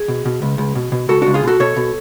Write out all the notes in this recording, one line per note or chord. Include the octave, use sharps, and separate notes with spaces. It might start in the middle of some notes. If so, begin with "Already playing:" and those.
Already playing: G#4
B2
B2
C#2
C#2
B2
B2
C#2 F#4 A4
C#2 D4 F#4
F4 G#4
B2 F#4 A4
B2 A4 C#5
B2